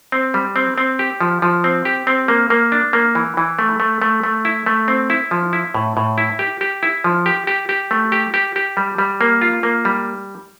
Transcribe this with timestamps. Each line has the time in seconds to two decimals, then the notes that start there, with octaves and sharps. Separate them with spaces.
0.12 C4
0.34 G3
0.56 C4
0.78 C4
0.99 G4
1.21 F3
1.42 F3
1.64 C4
1.85 G4
2.07 C4
2.28 A#3
2.50 A#3
2.72 D4
2.93 A#3
3.15 E3
3.37 E3
3.59 A3
3.80 A3
4.02 A3
4.23 A3
4.45 E4
4.66 A3
4.88 C4
5.10 E4
5.31 F3
5.53 E4
5.74 A2
5.97 A2
6.18 E4
6.39 G4
6.61 G4
6.83 E4
7.04 F3
7.26 G4
7.47 G4
7.69 G4
7.91 A3
8.12 G4
8.34 G4
8.56 G4
8.77 G3
8.98 G3
9.21 A#3
9.42 F4
9.63 A#3
9.85 G3